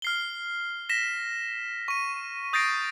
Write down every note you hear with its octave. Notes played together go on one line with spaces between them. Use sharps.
F6 C7 G7
A#6 B6 E7
C#6 D#7
D#6 G6 A6 A#6 C7 D7